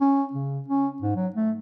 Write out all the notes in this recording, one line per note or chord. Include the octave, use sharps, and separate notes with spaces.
C#4
C#3
C#4
G#2
F#3
A3